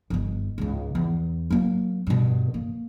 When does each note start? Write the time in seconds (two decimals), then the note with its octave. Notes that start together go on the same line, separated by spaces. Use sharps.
0.10 G1 D#3
0.58 C#2 G#2
0.95 E2
1.50 F#3 A#3
2.07 G2 B2
2.54 A#3